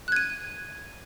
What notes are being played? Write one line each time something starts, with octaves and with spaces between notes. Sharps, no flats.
F#6 G#6 D#7